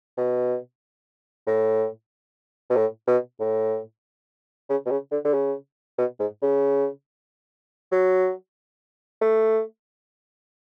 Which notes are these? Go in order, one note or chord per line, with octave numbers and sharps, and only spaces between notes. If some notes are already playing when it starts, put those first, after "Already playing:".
B2
A2
B2
A2
B2
A2
C#3
B2
C#3
D3
D3
C#3
B2
G#2
C#3
F#3
A3